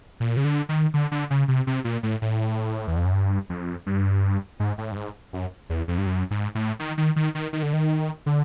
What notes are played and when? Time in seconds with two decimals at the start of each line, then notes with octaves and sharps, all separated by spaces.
0.20 A#2
0.37 C#3
0.45 D3
0.69 D#3
0.94 D3
1.11 D3
1.30 C#3
1.48 C3
1.67 C3
1.84 A#2
2.03 A2
2.22 A2
2.87 E2
2.96 F2
3.05 F#2
3.13 G2
3.50 F2
3.86 G2
4.60 G#2
4.78 A2
4.91 G2
4.96 G#2
5.33 F#2
5.70 E2
5.88 F2
5.98 G2
6.06 F#2
6.31 G#2
6.55 A2
6.79 D#3
6.98 D#3
7.16 D#3
7.35 D#3
7.53 D#3
7.63 D3
7.73 D#3
8.26 D3